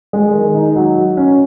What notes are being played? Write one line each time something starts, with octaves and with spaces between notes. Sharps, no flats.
G#3
D#3
D#4
F#3
F#4
C#4